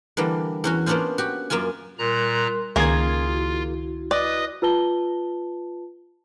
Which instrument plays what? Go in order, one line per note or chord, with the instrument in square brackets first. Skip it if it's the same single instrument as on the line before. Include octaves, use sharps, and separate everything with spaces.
[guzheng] D3 E3 G3 A#3
E2 C#4 F#4
A#3 B3 C#4 D4 F4 C5
F#4 G4
F#2 A#3 C#4 F4 G#5
[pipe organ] A#2 A#5 F#6 [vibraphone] G3 A#4 C6
[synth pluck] C#2 D#3 G#6 [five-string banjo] A#3 G#4 A#4 [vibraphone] C#4 [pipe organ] F4
[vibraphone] E4 F#4
[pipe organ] B4 D#5 D#6 [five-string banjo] D5
[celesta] F4 B4 A5 G7